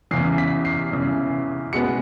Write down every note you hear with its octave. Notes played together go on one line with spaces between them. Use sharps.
E2 C#3 E3 C7
B6
C7
E2 C#3 E3
B2 G#3 B3 C#7